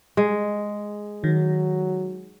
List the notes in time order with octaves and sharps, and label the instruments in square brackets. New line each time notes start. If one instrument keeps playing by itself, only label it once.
[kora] G#3
[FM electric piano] D#3 [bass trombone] F#3